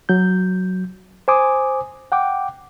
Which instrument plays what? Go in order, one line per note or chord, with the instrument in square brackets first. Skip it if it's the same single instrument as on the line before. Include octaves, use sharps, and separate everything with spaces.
[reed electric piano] F#3 G6
C5 G#5 D6 D#6
F#5 G5 D6